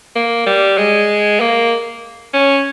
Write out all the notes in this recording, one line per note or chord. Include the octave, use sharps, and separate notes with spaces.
A#3
G3
G#3
A#3
C#4